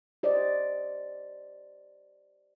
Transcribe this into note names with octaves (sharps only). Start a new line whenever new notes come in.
G4 C5 D5 D#5